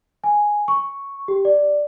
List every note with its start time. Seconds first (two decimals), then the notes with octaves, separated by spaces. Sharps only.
0.24 G#5
0.68 C#6
1.28 G4
1.45 D5